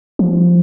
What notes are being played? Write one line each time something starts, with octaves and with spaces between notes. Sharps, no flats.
F3